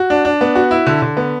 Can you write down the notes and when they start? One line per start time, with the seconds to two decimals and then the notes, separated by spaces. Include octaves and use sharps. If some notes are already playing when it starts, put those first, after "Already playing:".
Already playing: F#4
0.10 D4
0.25 D4
0.41 B3
0.55 F#4
0.71 E4
0.87 D3
1.02 D3
1.17 B3